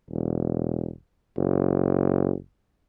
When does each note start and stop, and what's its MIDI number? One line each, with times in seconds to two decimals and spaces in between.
0.11 0.90 28
1.38 2.33 30